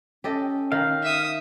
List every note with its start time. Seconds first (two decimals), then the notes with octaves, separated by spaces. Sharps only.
0.24 C#4 G4 A4 D#5
0.72 D#3 F5
1.03 E5 D#6